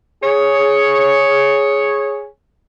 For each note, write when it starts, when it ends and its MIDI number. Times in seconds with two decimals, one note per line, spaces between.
0.23 2.26 68
0.23 2.26 73